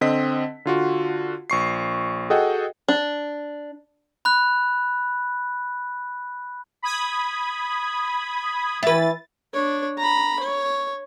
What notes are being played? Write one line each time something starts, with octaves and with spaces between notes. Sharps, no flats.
D3 C4 D#5 B6
D3 F4 F#4
A#1 C#6 C7
F#4 G#4 A4 D#5 F#5 G5
D4
B5 F#6
B5 D#6 G#6
E3 E4 B4 A6
D4 C#5
A#5 B5
C#5